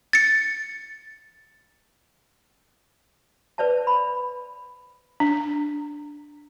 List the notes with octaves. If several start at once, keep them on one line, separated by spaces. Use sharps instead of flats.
A6 C#7
B4 C5 D5 E5 A5
B5
D4